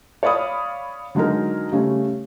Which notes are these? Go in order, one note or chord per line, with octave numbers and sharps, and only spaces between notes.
C#5 D5 F5 B5 D#6
D3 F#3 G#3 D#4 A#4
C#3 G3 A3 C#4